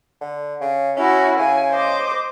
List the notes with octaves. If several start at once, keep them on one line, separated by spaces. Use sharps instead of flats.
D3
C#3
C#4 E4 F#4
C#3 G#5
C5 D#5 D6